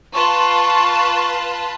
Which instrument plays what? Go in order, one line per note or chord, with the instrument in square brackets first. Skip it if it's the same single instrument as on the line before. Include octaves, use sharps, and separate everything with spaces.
[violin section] F4 B4 A5 [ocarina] C#6